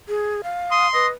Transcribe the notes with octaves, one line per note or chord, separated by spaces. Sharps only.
G#4
F5
C6 D#6
B4 D#5